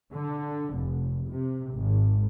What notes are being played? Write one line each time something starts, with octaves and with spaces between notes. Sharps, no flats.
D3
F1
C3
G#1